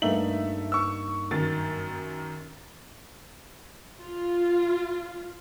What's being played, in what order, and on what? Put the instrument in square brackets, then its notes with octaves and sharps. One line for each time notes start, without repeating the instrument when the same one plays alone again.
[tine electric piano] G2 A#3 D#4 [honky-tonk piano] A3 E5 F#7
[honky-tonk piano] C#6 E6
F#2 D#3 A6
[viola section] F4